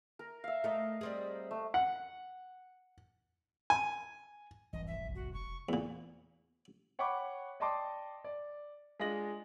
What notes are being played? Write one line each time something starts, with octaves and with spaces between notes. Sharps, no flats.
A#4
E5 F5
A3 A#4 D#5 A#5
G3 C4 G#4
A3
F#5
G#5
F1 C2 G#2 E3 D#5
E5
A#1
F#4
F#1 C#6
E1
E2 A#2
C#5 F#5 G5 B5 C#6 D6
D5 D#5 G5 A5 C6 D6
D5
G#3 D4 F4 D#5 A#6 F#7